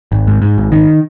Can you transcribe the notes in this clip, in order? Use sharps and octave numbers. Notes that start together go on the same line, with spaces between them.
G#1
G#2
G#2
G#1
D#3